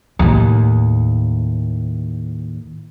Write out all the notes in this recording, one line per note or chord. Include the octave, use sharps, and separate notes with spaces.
D#2 A2